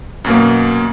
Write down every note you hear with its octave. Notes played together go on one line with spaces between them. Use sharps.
F#2 B2 A#3